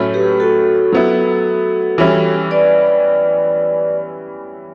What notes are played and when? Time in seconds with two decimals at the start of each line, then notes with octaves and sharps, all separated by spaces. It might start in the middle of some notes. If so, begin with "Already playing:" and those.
Already playing: A2 F#3 A3 C#4
0.14 G4 B4
0.40 F#4 A4
0.92 F#3 B3 E4
1.98 E3 G3 C#4 E4
2.51 B4 D5